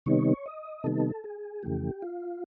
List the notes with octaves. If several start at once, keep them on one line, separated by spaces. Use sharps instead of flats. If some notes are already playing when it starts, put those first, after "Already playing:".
C3 D#3 G3 B3 D#4 C#5
D#5
C3 D#3 G3 B3 D#4 A4
G#4
F2 C#3 E3 A3 G4
F4